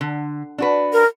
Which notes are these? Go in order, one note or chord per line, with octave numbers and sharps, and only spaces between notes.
D3
D4 F#4 B4
A#4